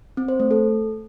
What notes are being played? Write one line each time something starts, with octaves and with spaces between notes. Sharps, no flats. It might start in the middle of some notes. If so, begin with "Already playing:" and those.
C4
C5
A3
A4